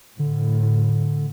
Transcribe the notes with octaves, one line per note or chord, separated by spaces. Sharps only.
A2 D3